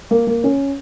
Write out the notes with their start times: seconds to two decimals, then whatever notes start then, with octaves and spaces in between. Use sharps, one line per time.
0.11 A#3
0.27 A#3
0.44 C#4